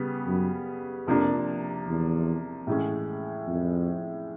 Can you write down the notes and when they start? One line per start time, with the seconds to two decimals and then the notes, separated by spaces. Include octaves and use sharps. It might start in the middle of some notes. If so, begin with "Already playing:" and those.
Already playing: C#3 G3 B3
0.27 F#2
1.07 F2 C3 F3 A#3 D4
1.87 E2
2.67 A2 E3 G#3 C#4
3.47 F2